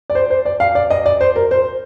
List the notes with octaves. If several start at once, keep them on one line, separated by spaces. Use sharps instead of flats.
D5
C5
C5
D5
F5
D5
D#5
D5
C5
A#4
C5